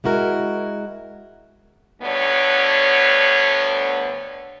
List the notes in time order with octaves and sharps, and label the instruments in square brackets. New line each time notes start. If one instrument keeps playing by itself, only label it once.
[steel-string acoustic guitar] G#3 E4 F#4 A#4
[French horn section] D2 G2 D3 B3 D4 C#5